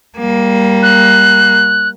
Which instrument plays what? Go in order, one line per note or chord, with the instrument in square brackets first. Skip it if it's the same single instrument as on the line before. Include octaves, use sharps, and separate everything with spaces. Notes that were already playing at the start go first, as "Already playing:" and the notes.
[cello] G3 A#3
[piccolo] F#6